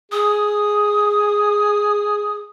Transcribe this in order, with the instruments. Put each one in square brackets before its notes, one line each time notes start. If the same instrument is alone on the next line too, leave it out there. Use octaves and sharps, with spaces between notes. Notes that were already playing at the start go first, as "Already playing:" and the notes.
[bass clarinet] G#4 [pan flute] D#6